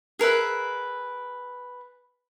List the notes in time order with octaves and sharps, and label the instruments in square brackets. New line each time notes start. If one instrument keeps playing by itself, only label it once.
[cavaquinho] G#4 A#4 B4 E5